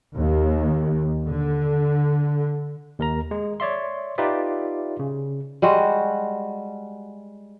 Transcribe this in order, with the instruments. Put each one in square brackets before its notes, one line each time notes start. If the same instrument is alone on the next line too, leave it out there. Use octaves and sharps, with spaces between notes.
[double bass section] D#2
D3
[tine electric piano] D#2 A#4 A#5
G#3
C#5 D5 E5 C6
D#4 F4 G4 B4 D5 E5
C#3
[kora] G3 G#3 F#4